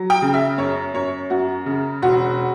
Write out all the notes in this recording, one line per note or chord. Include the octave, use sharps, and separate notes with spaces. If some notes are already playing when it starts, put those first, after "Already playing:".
Already playing: F#3
G5
C#3
E5
F#2 C#5
F#2 C#5
F#2 F#4
C#3
E1 F#4